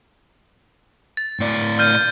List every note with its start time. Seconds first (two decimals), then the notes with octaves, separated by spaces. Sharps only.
1.17 A6
1.40 A2 D5
1.79 F6 G6 D#7